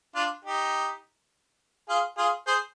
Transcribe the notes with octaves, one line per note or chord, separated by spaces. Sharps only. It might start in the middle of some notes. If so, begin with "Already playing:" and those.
D4 F4
D#4 G4
F4 G#4
F4 G#4
G#4 C5